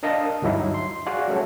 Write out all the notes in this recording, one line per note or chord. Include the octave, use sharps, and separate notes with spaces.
D4 A#4 D#5 F5 A5
D2 G2 F#3 D#4 E4
C6
F#4 G#4 D5 F5 G#5
F#3 G3 A3 C#4 A4